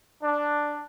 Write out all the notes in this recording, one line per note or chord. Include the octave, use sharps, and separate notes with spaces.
D4